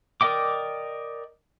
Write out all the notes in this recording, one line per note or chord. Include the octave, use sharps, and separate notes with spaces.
A#4 D5 D#5 G5 D6